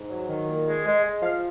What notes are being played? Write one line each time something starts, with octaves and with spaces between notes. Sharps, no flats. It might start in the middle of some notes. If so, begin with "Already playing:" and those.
Already playing: G#2
F#3
D#3
A#2
G#3
G#3
G#3
F3 F5